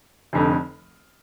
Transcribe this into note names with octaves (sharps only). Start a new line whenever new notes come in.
F1 F2 D3